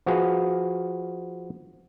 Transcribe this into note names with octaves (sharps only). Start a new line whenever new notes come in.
F3 F#4 G#4 B4 F5